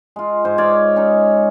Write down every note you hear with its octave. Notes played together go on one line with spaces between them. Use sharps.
G#3 F4
G#2 C5
C#5 D5 F5
C#4 D#4